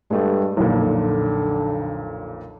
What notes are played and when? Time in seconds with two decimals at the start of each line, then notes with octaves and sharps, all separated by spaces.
0.11 G2 G#3 A3
0.57 B1 F2 A#2 D3